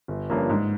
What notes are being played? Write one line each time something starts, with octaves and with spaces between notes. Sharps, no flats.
G1
G2 F3 A#3 C#4
G#2